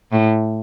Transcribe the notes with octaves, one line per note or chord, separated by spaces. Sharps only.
A2